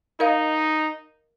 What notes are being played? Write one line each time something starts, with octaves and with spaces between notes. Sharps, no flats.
D#4 A#4 D#5 F5